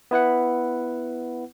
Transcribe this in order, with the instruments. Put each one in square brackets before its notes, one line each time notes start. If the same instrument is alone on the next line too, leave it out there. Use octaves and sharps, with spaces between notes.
[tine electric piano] B3 E4 B4 F#5